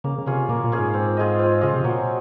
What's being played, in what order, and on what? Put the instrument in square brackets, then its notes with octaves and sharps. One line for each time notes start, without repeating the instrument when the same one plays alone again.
[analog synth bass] C#3 [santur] A#3
[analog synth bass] C#3
[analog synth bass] C3 [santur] C#4 F4 G#4
[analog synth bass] A#2 [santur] A#3
[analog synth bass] A#2
[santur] C#4 F4 G#4
[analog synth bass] G#2
[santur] C4
F4 G#4 D#5
C4
[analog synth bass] C#3 [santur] F4 G#4 D#5
[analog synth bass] C3
[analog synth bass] A#2 [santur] F#3